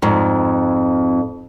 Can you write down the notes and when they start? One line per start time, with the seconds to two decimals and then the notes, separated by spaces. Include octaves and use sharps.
0.02 F2 G#2